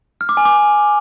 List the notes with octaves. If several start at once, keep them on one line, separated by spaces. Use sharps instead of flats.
F6
D6
G#5
D6